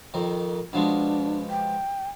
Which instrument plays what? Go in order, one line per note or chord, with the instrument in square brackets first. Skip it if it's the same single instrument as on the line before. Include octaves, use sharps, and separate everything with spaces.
[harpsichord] F2 D#3
[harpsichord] B2 F3 G#3 [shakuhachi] D4
[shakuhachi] G5